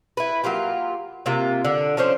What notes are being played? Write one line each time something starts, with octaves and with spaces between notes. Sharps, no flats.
E4 B4
F#3 A#3 F4 G4
C3 A#3 F4
D3 D4
F3 C#4 D4 C5